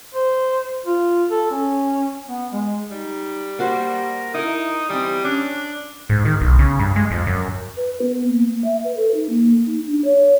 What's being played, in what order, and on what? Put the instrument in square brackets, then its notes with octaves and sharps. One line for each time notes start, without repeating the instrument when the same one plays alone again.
[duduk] C5
F4
A4
C#4
B3
G#3
[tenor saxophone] G3 [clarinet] D#4
[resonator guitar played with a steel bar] A#3 F#4 C5 [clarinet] A#4
[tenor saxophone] D#4 [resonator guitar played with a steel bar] E4 A#4 [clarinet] D#6
[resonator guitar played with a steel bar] E3 C4 [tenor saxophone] G3
[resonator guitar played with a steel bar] C#4 [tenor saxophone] D4
[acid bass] G#2
D#3
B1
C#3
G2
G#3
F2
F#2
[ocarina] B4
B3
A#3
A#3
E5
B4
A4
D#4
A#3
D#4
D4
C#5